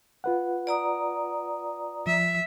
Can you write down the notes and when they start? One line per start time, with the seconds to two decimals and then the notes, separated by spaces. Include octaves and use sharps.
0.24 F4 B4 F#5
0.67 D5 A#5 D#6
2.07 F3 E5